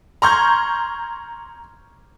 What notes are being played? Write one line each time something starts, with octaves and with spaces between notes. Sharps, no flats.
A#5 C6 C#6 F6 G6 G#6